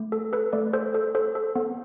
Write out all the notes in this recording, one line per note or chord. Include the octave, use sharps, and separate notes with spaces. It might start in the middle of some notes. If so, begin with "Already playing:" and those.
Already playing: A3
A4
A4 B4
A3 D5
A4 C5
A4
A4 C5
A4
B3